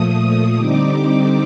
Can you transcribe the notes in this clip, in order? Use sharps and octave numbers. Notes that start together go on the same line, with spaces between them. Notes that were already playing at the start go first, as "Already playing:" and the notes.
Already playing: A#2 F3 A3 D#6
D3 G3 C4 D#4 D6